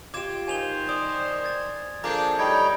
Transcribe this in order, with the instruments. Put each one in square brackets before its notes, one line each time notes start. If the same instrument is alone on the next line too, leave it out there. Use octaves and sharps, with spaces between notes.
[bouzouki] F4 G4 [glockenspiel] D6 G#6 E7
[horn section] D#3 C5 [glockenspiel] G#5 F7 G7
[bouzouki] D5 [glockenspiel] D#6
[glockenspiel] G#6 A6
[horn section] F3 A#3 D4 [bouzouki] G#4 A4 [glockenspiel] A#5 G6
[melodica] G3 D#4 C#5 [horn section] G5